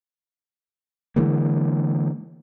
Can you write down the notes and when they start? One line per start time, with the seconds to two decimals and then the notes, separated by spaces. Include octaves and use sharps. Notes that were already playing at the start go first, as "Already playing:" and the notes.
1.16 D3 E3 G#3 A#3